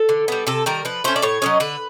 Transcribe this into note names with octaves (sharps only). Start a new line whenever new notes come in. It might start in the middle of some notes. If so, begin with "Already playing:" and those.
Already playing: A4
D3
G3 B3
C3 A4
D#3 G3 A#4
F3 B4
A3 C#4 C5
D5
A2 C#5
F#3 A#3 C#4 D#5
D3 B4